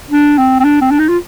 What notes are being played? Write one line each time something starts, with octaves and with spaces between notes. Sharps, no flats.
D4
C4
C4
D4
C4
D4
D#4
F4